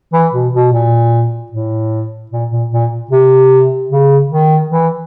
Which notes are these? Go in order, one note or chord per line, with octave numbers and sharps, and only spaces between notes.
E3
B2
B2
A#2
A2
A#2
A#2
A#2
C3
C#3
D#3
E3